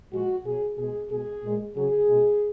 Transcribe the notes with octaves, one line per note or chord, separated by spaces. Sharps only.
A#2 F3 G#3 F#4
B2 F#3 G#4
B2 G#3 G#4
B2 G#3 G#4
A#2 G#3
C#3 F#3 G#4
B2 G#3